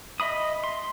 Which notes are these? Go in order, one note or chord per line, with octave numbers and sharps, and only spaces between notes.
D#5 E5 B5 D#6
C6